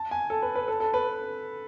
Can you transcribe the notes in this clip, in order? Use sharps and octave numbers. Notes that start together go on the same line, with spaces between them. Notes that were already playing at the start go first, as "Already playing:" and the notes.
Already playing: A5
G#5
A4
B4
B4
A4
A4
B4